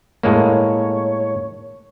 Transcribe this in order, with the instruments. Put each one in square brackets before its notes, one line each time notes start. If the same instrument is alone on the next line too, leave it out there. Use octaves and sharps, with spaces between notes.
[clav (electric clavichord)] A2 G#3 A#3 [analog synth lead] C#5